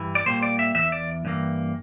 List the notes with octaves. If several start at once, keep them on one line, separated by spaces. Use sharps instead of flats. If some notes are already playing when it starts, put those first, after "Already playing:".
Already playing: G2 E3
D5
A#2 G3 A#3 C5
D5
E5
E2 E3 E5
D5
G2 E3 A#3